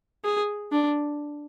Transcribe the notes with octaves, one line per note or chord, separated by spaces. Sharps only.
G#4
D4